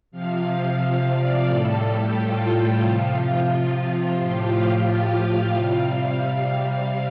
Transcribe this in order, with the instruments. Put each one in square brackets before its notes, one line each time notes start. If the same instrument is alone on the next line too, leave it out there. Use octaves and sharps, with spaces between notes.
[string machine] C3 F3 F5
F5
D5
A2 G3 A4
G4
F4
C3 F3
A2 F3 G4
F5
F5
C3 G3